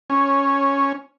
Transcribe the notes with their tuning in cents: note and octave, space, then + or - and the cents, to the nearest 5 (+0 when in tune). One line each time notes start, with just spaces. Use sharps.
C#4 +0 C#5 -10